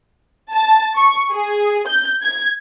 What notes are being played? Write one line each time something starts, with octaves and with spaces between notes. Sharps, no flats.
A5
C#6
G#4
G6
G#6